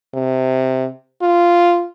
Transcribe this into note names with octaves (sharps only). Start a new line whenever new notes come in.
C3
F4